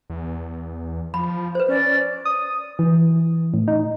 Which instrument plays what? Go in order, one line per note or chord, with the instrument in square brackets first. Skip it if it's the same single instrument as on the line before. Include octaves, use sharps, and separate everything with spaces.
[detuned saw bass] E2
[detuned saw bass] F3 [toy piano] B5
[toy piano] B4 C5
[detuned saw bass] C#4 [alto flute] D5
[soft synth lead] D#6
E3
A2
D#4